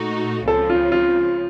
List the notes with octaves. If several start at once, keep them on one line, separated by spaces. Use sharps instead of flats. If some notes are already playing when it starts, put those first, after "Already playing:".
Already playing: A#2 A3 D#4 F#4
C#2 C#3 F3 C4 A4
F4
F4